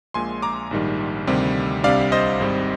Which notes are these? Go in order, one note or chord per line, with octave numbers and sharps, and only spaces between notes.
A#1 A#2 G#3 G#5 C6
A#5 D6
A#1 G#2 D#3 G3
D2 C3 D#3 G3 C4
C2 C3 G3 D4 D5 F5
C5 D#5
G#1 G#2 G3 C4